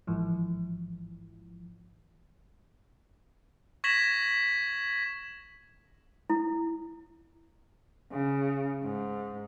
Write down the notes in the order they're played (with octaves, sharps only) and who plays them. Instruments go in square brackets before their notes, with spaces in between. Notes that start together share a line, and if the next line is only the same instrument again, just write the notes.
[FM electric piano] A1 G#2 E3 F3
[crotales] C#6 G#6 A#6 B6 E7 F#7
[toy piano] E4
[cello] C#3
G#2